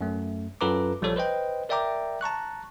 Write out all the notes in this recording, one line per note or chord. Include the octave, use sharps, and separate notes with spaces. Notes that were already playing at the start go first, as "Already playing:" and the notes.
F#2 A3
F#2 F4 A4 B4 A#5 D6
A#1 F3 G3 F4 A4 C#5
B4 C5 D#5 G5
A#4 D5 E5 G5 A#5 D6
A5 A#5 C#6 F#6